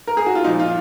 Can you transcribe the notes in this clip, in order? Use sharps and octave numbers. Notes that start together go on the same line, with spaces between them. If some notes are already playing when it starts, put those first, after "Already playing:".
A#4
G#4
F#4
F4
A#2 F3 D#4
F4